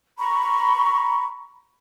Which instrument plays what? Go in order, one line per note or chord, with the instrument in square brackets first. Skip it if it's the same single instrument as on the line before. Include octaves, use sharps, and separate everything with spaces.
[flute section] A#5 B5 C#6